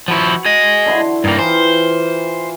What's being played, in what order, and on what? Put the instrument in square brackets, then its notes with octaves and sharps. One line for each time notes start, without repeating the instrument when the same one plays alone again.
[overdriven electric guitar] F3 E4 [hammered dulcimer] F#4 B5 C#6
[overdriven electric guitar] G#4 D#5
[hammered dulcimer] D3 E4 C6
[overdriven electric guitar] G2 A#3 [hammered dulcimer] D#4 F5 G5
[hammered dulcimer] E3 F4 [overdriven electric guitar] C5